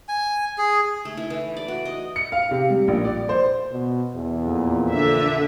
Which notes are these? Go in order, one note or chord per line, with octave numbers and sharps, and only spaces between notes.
G#5
G#4
A3
E4
E3
D5
F#4
D#5
C#7
F5
C3
G3
A#1
D5
C5
B2
E2
F2 A#2
D3 E5